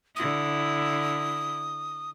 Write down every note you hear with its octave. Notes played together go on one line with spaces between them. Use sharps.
D3 E4 D#6